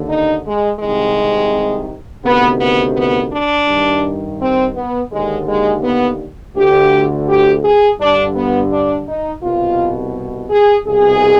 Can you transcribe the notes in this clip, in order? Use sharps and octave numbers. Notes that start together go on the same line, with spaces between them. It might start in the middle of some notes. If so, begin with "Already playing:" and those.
Already playing: D#2 D3
D#4
G#3
C2 C3 D#3 G#3
D2 C3 D#3 B3
B3
B3
D4
G2 D#3
C4
B3
D#2 D3 G#3
G#3
B3
D2 D3 G4
G4
G#4
G2 D3 D4
B3
D4
D#4
C2 B2 F4
G#4
C2 B2 G#4